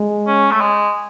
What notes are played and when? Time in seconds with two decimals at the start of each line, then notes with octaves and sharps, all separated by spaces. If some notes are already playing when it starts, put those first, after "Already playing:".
Already playing: G#3
0.27 C#4
0.51 A3
0.61 G#3